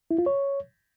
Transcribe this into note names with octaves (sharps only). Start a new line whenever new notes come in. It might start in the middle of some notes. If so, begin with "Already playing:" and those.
E4
F4
C#5